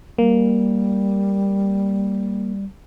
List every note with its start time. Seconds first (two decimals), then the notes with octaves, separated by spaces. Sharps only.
0.18 G3 A#3